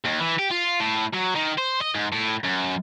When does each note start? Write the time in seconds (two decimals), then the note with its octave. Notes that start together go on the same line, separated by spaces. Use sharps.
0.04 D#2
0.20 E3
0.39 G4
0.51 F4
0.80 A2
1.13 F#3
1.35 D#3
1.58 C5
1.81 D#5
1.95 G#2
2.12 A2
2.44 F#2